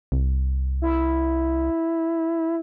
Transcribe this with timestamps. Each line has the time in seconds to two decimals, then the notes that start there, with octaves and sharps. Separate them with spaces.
0.12 C2
0.82 E4